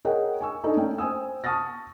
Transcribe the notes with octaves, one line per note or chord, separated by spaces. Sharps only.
G#4 A#4 C#5 D#5 F#5 G5
G#5 C#6 E6
D4 D#4 A4
A3 C#4 G5
C5 G5 G#5 D#6 E6
A5 C#6 D#6 F6 A6 A#6